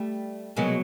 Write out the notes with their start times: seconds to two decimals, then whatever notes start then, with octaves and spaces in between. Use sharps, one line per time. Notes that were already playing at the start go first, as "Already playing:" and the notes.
Already playing: G3 A3
0.56 C2 B2 F#3 G#3 A#3